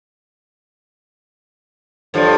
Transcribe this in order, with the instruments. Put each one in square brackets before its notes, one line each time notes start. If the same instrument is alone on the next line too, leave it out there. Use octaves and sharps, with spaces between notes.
[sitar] G2 F3 [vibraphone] A4 C#5 D5